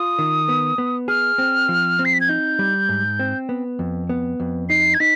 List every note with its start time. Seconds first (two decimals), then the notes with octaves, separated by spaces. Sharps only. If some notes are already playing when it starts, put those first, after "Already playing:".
Already playing: F4 D#6
0.19 D#3
0.49 B3
0.78 B3
1.08 G#4 F6
1.38 C4
1.69 F3
1.99 C4
2.05 C7
2.13 B6
2.20 G#6
2.29 D#4 G6
2.59 G3
2.89 G#2
3.19 C4
3.49 B3
3.79 F2
4.09 B3
4.40 F2
4.69 D#4 C7
4.94 G#6
5.00 D#4 B6